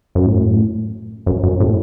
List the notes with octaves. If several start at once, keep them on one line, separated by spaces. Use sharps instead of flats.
F#2
A2
F#2
F#2
A2